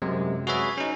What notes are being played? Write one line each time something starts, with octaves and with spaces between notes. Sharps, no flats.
F#2 C3 G#3
F#4 G#4 B4 C#5 E5
C#4 D#4